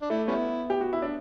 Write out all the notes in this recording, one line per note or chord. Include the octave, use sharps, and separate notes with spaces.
D4
A3 E4
G3 B3 C#4 E4
G4
F#4
E4
D4